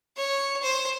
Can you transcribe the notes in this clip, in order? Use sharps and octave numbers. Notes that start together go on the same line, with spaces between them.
C#5
C5